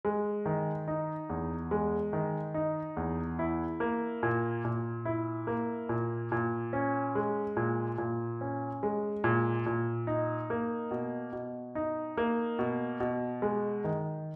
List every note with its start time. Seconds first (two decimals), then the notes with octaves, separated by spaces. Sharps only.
0.05 G#3
0.46 D#3
0.88 D#4
1.30 E2
1.71 G#3
2.13 D#3
2.54 D#4
2.97 E2
3.39 E4
3.80 A#3
4.23 A#2
4.65 A#2
5.05 E4
5.47 A#3
5.89 A#2
6.32 A#2
6.73 C#4
7.15 G#3
7.57 A#2
7.98 A#2
8.41 C#4
8.83 G#3
9.24 A#2
9.66 A#2
10.07 D#4
10.50 A#3
10.91 B2
11.33 B2
11.75 D#4
12.17 A#3
12.59 B2
13.00 B2
13.42 G#3
13.84 D#3